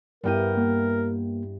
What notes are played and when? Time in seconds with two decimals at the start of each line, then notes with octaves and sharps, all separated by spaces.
0.24 G2 G3 B3 E4 A#4 G5 D#7
0.57 A#3